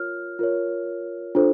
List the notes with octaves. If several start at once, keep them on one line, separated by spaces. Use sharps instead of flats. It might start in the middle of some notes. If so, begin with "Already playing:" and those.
Already playing: F4 A#4 C#5 F6
F4 A#4 C#5
D4 F4 A4 C5